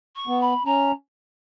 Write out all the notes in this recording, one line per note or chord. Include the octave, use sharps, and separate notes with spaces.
C#6
B3
B5
C#4 A#5